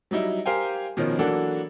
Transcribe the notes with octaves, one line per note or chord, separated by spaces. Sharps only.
F#3 G3 D#4 E4
G4 A#4 C5 F5 G5 G#5
B2 D#3 F3 C#4
E3 F#3 A#3 D4 F#4 A4